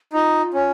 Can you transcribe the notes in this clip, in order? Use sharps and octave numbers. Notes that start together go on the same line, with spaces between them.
D#4 F4
C#4